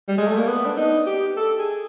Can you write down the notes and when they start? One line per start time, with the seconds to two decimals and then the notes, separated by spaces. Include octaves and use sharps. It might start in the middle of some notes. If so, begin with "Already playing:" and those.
0.08 G3
0.18 G#3
0.27 A3
0.37 A#3
0.47 B3
0.66 D4
0.77 D#4
1.06 G4
1.37 A4
1.59 G#4